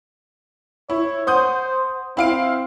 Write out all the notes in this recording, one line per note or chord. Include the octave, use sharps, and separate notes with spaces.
E4 C#5
C5 F#5 D#6 G6
C4 E4 F5 D7